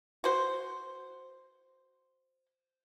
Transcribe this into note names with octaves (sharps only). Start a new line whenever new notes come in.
F#4 C5